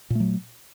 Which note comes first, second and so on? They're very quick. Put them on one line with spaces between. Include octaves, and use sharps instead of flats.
A#2 A3 F#3